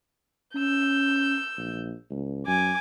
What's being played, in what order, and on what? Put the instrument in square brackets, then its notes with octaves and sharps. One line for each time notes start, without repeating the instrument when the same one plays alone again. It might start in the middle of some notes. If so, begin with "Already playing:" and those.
[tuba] C#4 [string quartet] E6 G6
[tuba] A#1
C#2
[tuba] F#2 [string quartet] G#5 D6